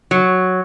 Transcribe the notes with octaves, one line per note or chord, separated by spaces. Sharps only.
F#3